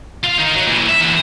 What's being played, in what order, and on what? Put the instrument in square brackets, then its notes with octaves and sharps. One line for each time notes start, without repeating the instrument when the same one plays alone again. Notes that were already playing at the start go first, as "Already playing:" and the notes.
[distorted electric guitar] F4 F5
D#3 D#4
F#3
A#2 E3
E5
E2 D3